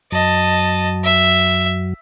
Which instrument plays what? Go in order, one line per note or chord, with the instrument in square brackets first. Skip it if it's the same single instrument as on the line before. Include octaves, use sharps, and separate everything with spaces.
[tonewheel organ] F#2 F#3 [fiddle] D#5 A5
[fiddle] E5